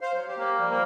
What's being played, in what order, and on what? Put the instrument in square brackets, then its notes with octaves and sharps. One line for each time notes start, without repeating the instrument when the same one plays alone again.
[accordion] C5 F5
F#3
G4
[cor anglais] A#3
[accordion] F3 G3
[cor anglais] A#3